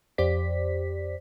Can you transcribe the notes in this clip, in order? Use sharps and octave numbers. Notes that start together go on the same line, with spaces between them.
F2 G4 C5 D5 B6